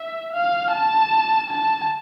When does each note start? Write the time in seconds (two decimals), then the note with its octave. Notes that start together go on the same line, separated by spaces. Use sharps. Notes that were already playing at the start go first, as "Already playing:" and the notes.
Already playing: E5
0.32 F5
0.72 A5
1.49 A5